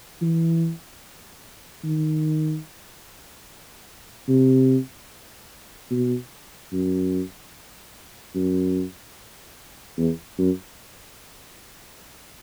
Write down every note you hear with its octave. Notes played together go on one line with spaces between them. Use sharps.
E3
D#3
C3
B2
F#2
F#2
E2
F#2